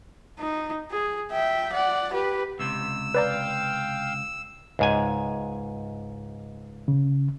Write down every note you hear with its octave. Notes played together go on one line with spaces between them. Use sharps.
D#4
G#4
E5 G5
D5 F#5
G4 B4
C#2 C3 E6
B4 D5 F5 G5 A#5
C#2 G#2 G#5
C#3